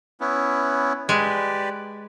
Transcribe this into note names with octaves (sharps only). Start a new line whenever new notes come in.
B3 C#4 E4
G#3 G4 B4 D5